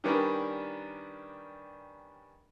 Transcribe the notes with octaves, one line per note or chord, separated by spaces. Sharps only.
D#3 G3 C#4 D4 A#4 B4